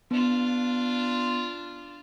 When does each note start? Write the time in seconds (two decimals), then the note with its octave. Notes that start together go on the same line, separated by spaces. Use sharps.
0.11 B3 D4 F4